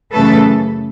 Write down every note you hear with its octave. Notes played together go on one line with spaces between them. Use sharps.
F#2 C#3 E3 A3 A4 B4